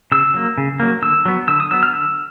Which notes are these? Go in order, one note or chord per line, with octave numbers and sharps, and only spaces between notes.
C#3 E6
F#3 A#3
C#3
F#3 A#3
D3 E6
F#3 B3
D3 E6
D#6
F#3 B3 E6
F6
D3 E6